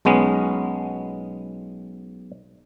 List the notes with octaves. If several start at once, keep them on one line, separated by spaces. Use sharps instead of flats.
B1 G#3 B3 C#4